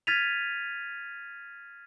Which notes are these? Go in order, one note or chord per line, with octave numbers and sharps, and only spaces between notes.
F6 G#6 A6 B6 D#7 F7